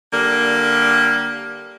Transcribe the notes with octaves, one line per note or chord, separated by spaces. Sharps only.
D3 G3 A#3